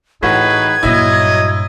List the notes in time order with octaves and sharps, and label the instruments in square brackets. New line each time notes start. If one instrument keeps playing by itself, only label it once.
[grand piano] A2 F#4 [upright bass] E3 [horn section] D#4 G#4 B4 [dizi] G#6
[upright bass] G2 A#2 [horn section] F#3 D#5 [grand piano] E4